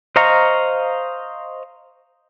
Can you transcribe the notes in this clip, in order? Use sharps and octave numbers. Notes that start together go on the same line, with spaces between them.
C5 D#5 F5 A#5 C#6